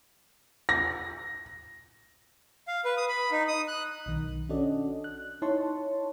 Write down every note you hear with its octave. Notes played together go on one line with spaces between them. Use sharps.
A#6
F5
B4
D#6
B5
D#4
D#6
F#6
B1 D#3
C#4 D4 F#4 A4 D5 D#5
F#6
D#4 E4 C#5 A5 C6 C#6